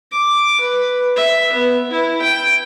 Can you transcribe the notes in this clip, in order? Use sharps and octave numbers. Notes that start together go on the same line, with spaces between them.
D6
B4
E5
B3
E4
G5